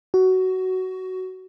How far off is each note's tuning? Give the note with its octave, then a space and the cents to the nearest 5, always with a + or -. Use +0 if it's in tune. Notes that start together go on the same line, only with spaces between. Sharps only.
F#4 +15